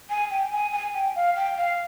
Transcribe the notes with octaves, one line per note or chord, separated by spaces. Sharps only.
G#5
G5
G#5
G#5
G5
F5
G5
F5